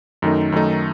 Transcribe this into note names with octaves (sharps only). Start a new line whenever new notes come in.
F#2 D#3 A3 D#4
F#2 D#3 A3 D#4